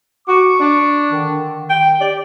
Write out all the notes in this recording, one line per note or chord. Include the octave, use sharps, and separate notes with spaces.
F#4 C#6 D6
D4
D3 D#3
G5
G4 D5